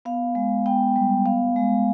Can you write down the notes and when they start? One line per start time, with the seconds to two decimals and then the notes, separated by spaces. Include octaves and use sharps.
0.05 B3 F5
0.35 G#3
0.66 B3 G5
0.96 G3
1.25 B3 F5
1.56 G#3